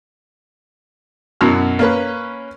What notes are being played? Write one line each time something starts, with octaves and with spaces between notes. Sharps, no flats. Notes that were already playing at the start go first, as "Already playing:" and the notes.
F#2 B2 E4 F#4 F6
A#3 C#4 B4